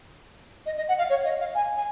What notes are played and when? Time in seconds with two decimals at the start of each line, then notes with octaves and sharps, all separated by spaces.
0.66 D#5
0.77 D#5
0.88 F#5
0.99 F5
1.10 C#5
1.25 D#5
1.40 F5
1.55 G#5
1.77 G#5